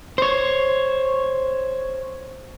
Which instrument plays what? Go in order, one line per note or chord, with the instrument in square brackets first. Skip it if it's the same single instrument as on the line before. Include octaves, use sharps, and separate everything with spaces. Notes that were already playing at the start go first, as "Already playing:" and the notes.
[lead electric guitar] C5 C#5